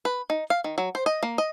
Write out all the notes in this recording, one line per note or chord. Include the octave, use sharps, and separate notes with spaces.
B4
D#4
F5
D#3
F#3
C5
D#5
A#3
D#5